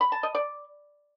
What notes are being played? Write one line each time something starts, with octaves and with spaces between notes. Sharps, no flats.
B5
A5
D#5
D5